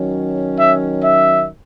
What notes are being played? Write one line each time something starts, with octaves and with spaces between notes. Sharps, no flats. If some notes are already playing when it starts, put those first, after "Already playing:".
Already playing: D#3 F#3 C#4
E5
E5